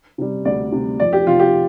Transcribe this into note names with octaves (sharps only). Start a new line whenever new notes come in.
C3 G3
D2 D5
C3 G3
F2 D5
G4
C3 F3 F4
G4